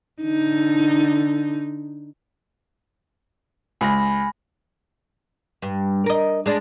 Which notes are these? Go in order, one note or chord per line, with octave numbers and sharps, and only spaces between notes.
D3 D#4
C#2 G#5 B5 A#6
G2
A#4 D#5
G#3 D4